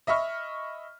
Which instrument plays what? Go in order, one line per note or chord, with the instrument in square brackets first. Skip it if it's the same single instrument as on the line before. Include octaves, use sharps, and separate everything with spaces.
[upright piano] D#5 E5 B5 C#6 F6